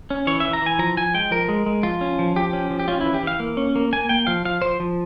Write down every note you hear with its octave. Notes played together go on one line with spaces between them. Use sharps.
C#4
E3 C#5
E3 E5
A#5
E3 G#5
F3 A#5
F3 G#5
G#3 G5
F3 A#4
G#3
G#3
F3 F4
C#4
F3
F3 G4
C#4
F3
G4
C#4 F4
E3 E4
G4
E3 F5
A#3
C#4
A#3
A#3 G#5
A#3 G5
F3 F5
F3 F5
F3 C5
F3